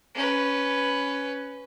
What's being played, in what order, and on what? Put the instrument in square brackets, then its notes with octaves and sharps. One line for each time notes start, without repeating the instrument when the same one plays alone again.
[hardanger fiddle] C#4 B4